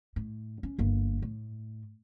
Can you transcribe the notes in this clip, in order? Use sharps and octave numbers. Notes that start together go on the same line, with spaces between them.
A2
C#4
G1 A#3
A2